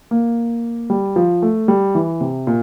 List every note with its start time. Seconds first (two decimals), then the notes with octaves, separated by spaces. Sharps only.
0.11 A#3
0.90 G3
1.16 F3
1.42 A3
1.68 G3
1.95 E3
2.21 C3
2.47 A#2